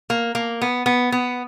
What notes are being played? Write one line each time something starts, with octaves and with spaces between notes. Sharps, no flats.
A#3
A#3
B3
B3
B3